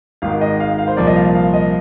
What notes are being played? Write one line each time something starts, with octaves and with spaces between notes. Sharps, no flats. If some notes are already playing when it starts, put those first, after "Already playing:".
G#1 G#2 D#3 F5
D#5
F5
F5
C5
C2 A#2 F3 A#3 D5
D#5
F5
F5
D#5